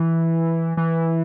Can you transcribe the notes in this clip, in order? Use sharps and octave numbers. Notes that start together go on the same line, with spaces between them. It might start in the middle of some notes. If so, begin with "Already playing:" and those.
Already playing: E3
E3